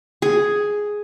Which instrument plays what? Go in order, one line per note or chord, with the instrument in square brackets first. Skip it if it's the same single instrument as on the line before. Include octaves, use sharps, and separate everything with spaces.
[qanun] G#4